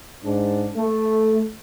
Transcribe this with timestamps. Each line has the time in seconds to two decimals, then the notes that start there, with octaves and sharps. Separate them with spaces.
0.24 G#2 D4
0.76 A3